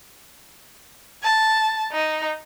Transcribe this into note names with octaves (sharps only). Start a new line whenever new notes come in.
A5
D#4